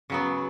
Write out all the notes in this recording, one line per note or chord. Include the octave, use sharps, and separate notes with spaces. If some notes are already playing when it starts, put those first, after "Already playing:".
C#3 F#3 B3